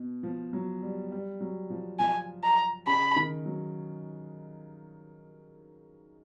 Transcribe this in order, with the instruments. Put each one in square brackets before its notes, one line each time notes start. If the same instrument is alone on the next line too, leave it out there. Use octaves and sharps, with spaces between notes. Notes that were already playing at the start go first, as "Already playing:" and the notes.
Already playing: [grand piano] B2
F3
F#3
G3
G3
F#3
F3
[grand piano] F3 [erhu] G#5
[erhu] A#5
[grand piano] C#3 [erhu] B5
[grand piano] D#3
F#3